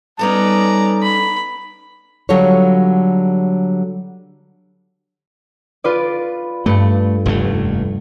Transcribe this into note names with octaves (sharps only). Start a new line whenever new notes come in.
G3 B3 C#4 D#4 A4 D5 A#5
B5
D3 F#3 G3 F4 A4 C#5
F4 B4 D5
G2 A3 C#7
F1 D#2 A3